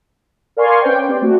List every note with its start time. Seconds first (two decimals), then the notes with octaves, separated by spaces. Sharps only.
0.57 A#4 D5 F5 G#5 C6 C#6
0.81 C#4 B4 C5 G5
1.09 C4 G4 D5
1.22 A3 F#4